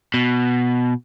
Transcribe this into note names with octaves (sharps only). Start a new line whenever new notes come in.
B2